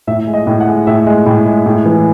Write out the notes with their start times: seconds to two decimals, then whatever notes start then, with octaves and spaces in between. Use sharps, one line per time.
0.07 A2 E5
0.27 G#3
0.34 D#5
0.47 A2
0.60 F#5
0.67 G#3
0.87 A2 E5
1.06 G#3
1.26 A2
1.46 G#3
1.66 A2
1.85 E3